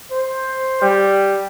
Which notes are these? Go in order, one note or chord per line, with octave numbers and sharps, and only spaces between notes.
C5
G3